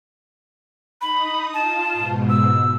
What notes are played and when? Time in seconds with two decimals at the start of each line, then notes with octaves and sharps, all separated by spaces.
1.01 D#4 B5 D#6
1.54 F4 A5
1.93 G#2 B2
2.29 E6